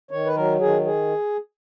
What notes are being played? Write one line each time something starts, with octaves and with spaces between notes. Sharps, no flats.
D#3 C#5
B4
F#3 A#4
D#3 G#4
G#4